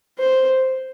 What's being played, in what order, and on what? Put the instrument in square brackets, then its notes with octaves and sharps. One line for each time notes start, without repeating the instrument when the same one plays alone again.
[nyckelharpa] C5